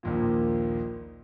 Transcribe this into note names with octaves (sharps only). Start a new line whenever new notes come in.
A#1 D#2 A#2